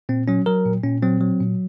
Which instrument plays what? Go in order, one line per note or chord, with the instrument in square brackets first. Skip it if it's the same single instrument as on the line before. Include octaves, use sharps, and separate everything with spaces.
[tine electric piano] A#2 C4
F#3 C#4
F#3 A#4
A#2
A#2 C#4
F#3 C4
F#3
A#2